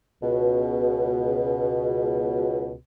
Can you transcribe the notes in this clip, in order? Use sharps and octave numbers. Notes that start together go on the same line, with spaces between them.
C#2 B2